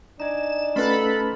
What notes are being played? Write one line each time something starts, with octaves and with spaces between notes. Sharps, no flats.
D4 D#4 G#5 E7
A3 C#4 F4 A4 B4 F#5 B5